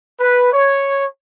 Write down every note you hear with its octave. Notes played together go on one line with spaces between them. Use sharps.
B4
C#5